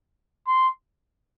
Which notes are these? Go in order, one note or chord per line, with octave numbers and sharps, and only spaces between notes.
C6